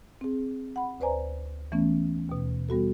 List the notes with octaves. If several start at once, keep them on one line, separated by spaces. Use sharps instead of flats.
C4 G#4
F#5 B5
D2 B4 C5 D5 G#5 A#5
E3 A3 B3 C#4
D#2 B2
G3 B3 F#4 A4